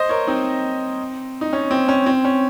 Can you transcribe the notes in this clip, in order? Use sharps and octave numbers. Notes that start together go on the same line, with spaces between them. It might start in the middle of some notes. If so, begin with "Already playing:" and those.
Already playing: C5 D#5
A#4 C#5
C4 D#4
D#4
C#4
C4
C#4
C4
C#4